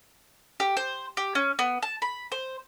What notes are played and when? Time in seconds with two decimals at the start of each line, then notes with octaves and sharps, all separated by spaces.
0.60 G4
0.77 C5
1.17 G4
1.35 C#4
1.59 B3
1.83 A5
2.02 B5
2.32 C5